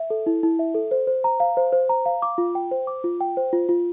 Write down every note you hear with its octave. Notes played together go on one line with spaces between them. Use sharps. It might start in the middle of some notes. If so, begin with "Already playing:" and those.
Already playing: E5
A4
E4
E4
E5
A4
C5
C5
A#5
F5
C5
C5
A#5
F5
D6
F4
G5
C5
D6
F4
G5
C5
F4
F4